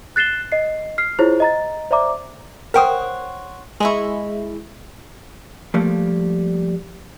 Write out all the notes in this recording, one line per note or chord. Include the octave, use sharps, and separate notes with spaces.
F#6 A6 C7 E7 G7
D#5 C7
F6 C7
E4 F4 G#4 C5 C#5
D#5 A#5 A6
C5 D5 E5 A#5 D6
A#4 C5 C#5 F#5 G5 D#6
G#3 E4 D#5 E5 C#6
F3 G3 A3 A#3